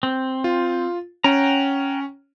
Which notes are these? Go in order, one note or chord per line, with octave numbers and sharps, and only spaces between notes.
C4
F4
C#4 F#5 G5 A#5